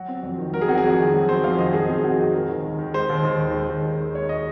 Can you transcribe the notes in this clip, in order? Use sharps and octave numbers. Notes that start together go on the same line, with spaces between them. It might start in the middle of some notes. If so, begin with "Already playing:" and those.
Already playing: F#3 F#4
C4
F2
D#3
F#3 A#4
G#4
C4 F#4
G#4
F2
D#3
F#3
C4 C5
F2 F5
D#3 D#5
F#3 G#4
C4 G#4
F2 F#4
D#3
G#3 A#4
D#2
D#2
D#3
G#3 C5
D#2
D#2
D#3
G#3
D#2
D#2
D#3
G#3 C#5
D#5